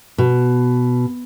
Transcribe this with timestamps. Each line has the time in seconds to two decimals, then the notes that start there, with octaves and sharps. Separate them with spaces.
0.18 B2